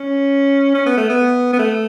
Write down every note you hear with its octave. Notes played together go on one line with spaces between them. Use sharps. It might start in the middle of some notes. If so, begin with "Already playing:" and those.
Already playing: C#4
C#4
B3
A3
B3
B3
A3